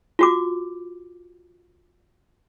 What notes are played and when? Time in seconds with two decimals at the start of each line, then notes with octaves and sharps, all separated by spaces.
0.19 F4 F#4 D6